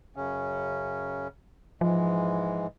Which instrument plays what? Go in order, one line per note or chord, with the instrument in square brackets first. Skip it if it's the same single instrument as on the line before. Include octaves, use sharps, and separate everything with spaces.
[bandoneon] F#2 C#3 C#4
[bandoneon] G#2 E3 G#3 [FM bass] F3